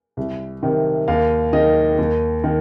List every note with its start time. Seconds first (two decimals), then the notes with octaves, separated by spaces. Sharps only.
0.17 C2
0.63 C3 D#3
1.08 D#2 F5
1.53 D#3 D#5
1.98 D#2
2.44 D#3